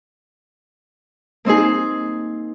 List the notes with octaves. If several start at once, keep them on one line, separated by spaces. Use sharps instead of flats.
A#3 C4 D#4 G#4